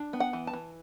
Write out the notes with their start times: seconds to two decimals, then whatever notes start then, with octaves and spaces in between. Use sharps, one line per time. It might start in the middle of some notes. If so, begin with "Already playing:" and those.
Already playing: D4
0.13 B3
0.20 F#5
0.33 E3
0.47 A5
0.53 E3